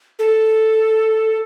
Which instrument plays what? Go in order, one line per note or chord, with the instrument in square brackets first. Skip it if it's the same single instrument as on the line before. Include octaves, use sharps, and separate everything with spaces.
[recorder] A4